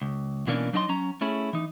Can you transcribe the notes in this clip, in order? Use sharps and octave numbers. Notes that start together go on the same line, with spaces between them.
C#2
B2 E3 A#3 C#4 D4
F#3 D4 D#4 D#5 E5 C6
F#3 C#4 A#5
A3 C#4 E4 G#4
E3 D#4